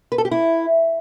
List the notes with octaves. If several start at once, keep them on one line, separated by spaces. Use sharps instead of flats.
B4
A4
G4
E4